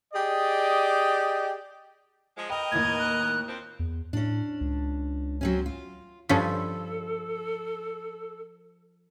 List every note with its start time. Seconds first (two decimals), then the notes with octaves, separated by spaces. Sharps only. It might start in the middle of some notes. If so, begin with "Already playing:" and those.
0.13 G4 G#4 D5 D#5
2.37 F3 G#3
2.50 A#4 B4 D#5 G5
2.72 D#2 A2 G#6
2.99 F#6
3.48 F3 C4
3.79 E2
4.13 A2 C#4 D4
4.61 C#2
5.41 F#3 C4 C#4
5.66 F4
6.29 G2 F3 C#4 A4 B6